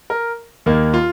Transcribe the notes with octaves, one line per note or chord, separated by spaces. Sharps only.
A#4
D#2 D#3 A#3
F4